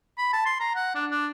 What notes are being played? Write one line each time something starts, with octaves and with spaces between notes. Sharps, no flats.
B5
A5
C6
A#5
F#5
D4
D4